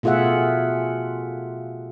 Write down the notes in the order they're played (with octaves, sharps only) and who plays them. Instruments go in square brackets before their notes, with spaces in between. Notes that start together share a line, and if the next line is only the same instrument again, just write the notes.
[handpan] B2 A3 F4 G#4 E5 F#5